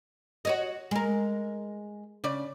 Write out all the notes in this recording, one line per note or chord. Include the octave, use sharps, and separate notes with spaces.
F#4 C#5 D#5
G#3 A#4
C#3 D5